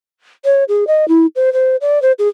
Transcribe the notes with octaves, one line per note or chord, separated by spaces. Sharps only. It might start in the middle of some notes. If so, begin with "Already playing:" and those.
C#5
G#4
D#5
E4
C5
C5
D5
C5
G#4